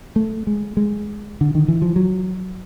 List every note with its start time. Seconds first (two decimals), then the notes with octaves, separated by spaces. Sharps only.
0.16 A3
0.47 G#3
0.77 G#3
1.41 D3
1.55 D#3
1.68 E3
1.82 F3
1.96 F#3